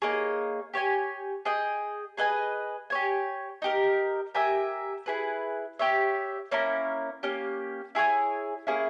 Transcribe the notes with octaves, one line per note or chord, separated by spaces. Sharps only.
A#3 D#4 G#4 C#5
G4 C#5 G#5
G#4 D#5 G5
G#4 B4 D#5 G#5
G4 C#5 G#5
D#4 G4 A#4
G4 A#4 E5 G#5
E4 G#4 B4
G4 C#5 E5
A#3 C#4 E4 A#4
A#3 C#4 G4
E4 G#4 C#5 G#5
A#3 C#4 E4 G#4